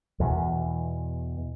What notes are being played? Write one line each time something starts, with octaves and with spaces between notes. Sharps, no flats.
E2 B2 E3